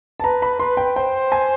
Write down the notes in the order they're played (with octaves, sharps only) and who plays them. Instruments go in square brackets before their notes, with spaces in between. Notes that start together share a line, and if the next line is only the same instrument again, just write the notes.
[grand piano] A5
[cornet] B4 [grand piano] A#5
[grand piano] B5
[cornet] B4 [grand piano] C6
[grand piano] G5
[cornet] C5 [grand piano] G5
[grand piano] G#5